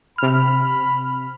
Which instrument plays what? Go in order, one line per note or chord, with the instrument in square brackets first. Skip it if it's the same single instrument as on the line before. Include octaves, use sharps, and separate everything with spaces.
[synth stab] C3 F6 [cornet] B5